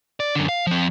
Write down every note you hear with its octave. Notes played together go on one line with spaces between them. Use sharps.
D5
F#2 D3
F5
F3 C4